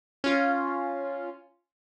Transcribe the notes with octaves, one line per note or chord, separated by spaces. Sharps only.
C#4 F4